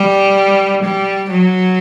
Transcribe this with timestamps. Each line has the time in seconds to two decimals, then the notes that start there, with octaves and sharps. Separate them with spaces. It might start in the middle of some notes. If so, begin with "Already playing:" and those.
Already playing: G3
0.84 G3
1.31 F#3